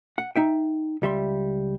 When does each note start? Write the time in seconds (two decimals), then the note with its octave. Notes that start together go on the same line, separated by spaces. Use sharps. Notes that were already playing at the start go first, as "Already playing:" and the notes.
0.18 F#5
0.36 D#4 E5 G5
1.02 C#2 G3 E5 C6